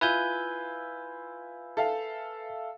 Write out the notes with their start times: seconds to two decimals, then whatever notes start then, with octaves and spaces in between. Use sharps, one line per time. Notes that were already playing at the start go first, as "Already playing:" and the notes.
0.01 E4 F4 B4 G#5 G6
1.77 A4 E5 F5